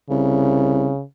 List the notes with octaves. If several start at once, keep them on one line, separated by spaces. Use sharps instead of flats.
C2 C#3